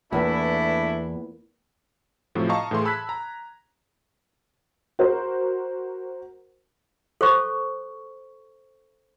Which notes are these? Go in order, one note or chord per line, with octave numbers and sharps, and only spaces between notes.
E2 A3 A#3 D4 E4 B4
A2 C3 F3 F#3
D#5 F5 A5 A#5 C#6
A2 E3 G#4 C6
A5 B5 E6 F#6 G#6 B6
A#5
F#4 A#4 C5
A4 C5 C#6